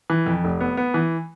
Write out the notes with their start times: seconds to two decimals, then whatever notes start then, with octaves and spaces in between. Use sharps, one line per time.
0.10 E3
0.26 F2
0.44 F1
0.60 B3
0.77 B3
0.94 E3